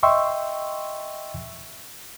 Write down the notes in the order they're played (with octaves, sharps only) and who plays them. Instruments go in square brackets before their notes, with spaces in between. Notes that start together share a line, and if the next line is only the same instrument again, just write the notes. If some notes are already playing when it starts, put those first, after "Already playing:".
[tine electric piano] D#5 E5 G5 C6 C#6 E6